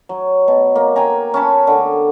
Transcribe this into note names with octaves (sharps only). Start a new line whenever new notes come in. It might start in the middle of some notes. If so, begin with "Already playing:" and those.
F#3
B2
A#3
G5 G#5 A#5
C#4 A5 B5
D3